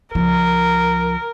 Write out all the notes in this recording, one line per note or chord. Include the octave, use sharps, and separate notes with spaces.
C#2 F3 A#4